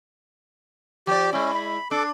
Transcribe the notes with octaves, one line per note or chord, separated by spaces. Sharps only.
F3 G4 D5
G#3 C#4 E4
B5
D4 A4 D6